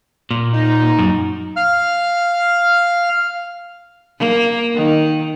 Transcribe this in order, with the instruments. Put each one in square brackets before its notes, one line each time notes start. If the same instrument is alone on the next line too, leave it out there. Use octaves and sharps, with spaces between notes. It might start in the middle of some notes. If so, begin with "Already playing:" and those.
[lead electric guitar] A#2
[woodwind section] D#4
[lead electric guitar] F#2
[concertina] F5 F6
[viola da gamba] A#3
D#3